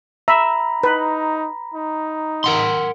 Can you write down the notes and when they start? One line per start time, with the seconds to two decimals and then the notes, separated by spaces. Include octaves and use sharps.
0.28 E5 A#5 B5
0.84 D#4 B4
1.74 D#4
2.44 A#4 F#5 C6